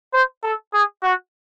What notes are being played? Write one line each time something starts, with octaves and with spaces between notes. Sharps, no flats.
C5
A4
G#4
F#4